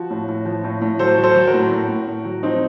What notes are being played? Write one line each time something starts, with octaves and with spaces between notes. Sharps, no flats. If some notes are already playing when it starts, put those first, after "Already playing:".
Already playing: F3 F#4
A2
A2
F3
A2
A2
F#3 A4 C5
F#3
A4 C5
F#3
F#4 A#4
A2
A2
A2
A2
F#3
F3 C4 D#4